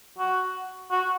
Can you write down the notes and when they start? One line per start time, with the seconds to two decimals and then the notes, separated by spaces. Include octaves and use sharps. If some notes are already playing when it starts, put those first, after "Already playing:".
0.19 F#4
0.91 F#4